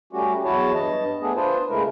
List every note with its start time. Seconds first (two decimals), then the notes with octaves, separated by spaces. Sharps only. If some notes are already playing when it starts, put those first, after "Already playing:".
0.13 G3 A3 C#4 F#4 G4
0.45 E2 F#3 E4 F#4 C#5 A5
0.74 G2 D#5 A5
1.22 A3 B3 D4 G#4
1.36 D4 F4 B4 C5
1.70 C#3 G#3 A3 E4 A#4